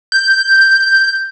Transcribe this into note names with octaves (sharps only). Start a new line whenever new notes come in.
G6